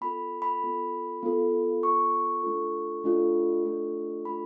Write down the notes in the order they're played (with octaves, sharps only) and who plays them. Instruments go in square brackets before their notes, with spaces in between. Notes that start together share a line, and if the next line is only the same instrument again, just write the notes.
[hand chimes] B3 F4 A4 B5
B5
B3 F4 A4
B3 F4 A4
B3 F4 A4 C#6
A3 D4 F4 A4
A3 D4 F4 A4
A3 D4 F4 A4
A3 D4 F4 A4 B5